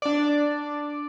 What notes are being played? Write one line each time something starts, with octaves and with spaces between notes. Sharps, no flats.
D4 D5